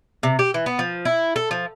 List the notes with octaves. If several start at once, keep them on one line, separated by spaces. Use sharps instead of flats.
C3
G4
E3
B3
F3
E4
A4
F3